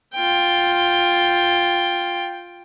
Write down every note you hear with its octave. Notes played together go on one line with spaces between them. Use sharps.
F4 G5